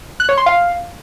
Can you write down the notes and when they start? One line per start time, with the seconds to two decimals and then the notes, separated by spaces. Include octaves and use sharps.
0.20 F#6
0.29 C#5
0.38 C6
0.46 F5